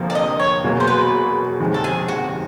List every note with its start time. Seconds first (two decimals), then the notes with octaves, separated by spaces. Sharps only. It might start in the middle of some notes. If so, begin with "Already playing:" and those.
Already playing: F1 F2 D3 F3 A#3
0.10 D5
0.15 D#5
0.40 C#5
0.64 E2 B2 F#3 A#3
0.80 C5
0.87 B4
1.60 G1 F2 C3 D#3 G#3
1.74 A4
1.84 G#4
2.08 F#4